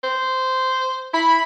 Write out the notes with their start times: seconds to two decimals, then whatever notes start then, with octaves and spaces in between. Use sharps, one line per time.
0.04 C5
1.14 E4 B5